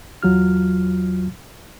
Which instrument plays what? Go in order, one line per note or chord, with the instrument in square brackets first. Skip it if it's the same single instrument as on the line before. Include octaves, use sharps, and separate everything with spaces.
[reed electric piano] E2 F#3 F4 F6